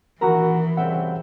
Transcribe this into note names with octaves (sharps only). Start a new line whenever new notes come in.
A#1 D#3 E3 E4 F#4 A#4 A#5
C2 C#3 C4 E5 F#5 G5